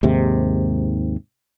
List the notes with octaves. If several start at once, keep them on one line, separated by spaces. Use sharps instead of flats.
D#2 G#2 C3